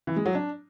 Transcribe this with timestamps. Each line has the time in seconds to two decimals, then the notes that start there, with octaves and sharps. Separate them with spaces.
0.07 E3
0.16 G#3
0.26 F#3
0.35 D4